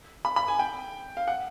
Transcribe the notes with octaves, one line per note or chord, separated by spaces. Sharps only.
B5
B5
G#5
G5
F5
F#5